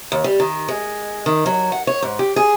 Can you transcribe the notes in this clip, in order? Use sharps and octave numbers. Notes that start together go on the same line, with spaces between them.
D#2
G3
D#3
G#3
D#3
F#3
F#5
C#5
G#2
G4
G#4